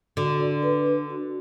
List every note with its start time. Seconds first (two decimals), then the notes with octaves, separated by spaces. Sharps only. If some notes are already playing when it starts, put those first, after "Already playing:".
0.17 D3 F#4
0.40 D5
0.63 B4
0.86 D4
1.10 F#4